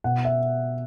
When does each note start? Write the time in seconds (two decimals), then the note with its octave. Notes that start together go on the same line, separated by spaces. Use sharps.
0.04 B2 F#5
0.25 E5